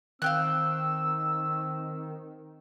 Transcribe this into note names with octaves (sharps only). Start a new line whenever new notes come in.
D#3 C4 F5 G5 E6 F#6